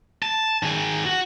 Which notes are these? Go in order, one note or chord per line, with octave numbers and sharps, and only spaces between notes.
A5
D#3 G#4
F#4